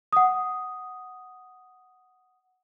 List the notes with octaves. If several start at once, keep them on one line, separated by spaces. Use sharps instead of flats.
F#5 D#6